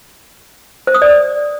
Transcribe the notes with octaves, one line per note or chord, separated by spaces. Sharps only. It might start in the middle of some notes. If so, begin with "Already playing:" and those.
C5
D#6
D5